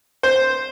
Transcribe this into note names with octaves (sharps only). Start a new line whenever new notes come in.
C5